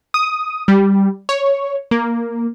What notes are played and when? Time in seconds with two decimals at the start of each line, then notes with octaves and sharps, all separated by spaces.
0.14 D#6
0.68 G3
1.29 C#5
1.91 A#3